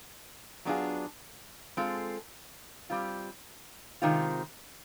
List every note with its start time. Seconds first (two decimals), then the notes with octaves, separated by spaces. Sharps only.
0.65 F#3 B3 D4 F4 G#4
1.77 G#3 C4 F4 A4
2.90 G3 C4 F4
4.02 C3 D#3 G#3 C4 F4